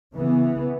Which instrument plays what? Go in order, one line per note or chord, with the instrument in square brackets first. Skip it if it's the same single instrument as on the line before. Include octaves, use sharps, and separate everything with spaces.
[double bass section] C#3 E3 B3